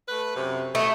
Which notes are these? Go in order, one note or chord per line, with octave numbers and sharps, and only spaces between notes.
A3 B4
F#2 C3
B2 A3 D#5